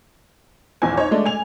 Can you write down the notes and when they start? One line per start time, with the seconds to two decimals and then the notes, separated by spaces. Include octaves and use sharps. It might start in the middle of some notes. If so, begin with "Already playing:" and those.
0.82 A#1 E2 C4 G#5
0.97 D#4 C5 C#5
1.11 G#3 A3 D4 D5
1.26 G#5 F7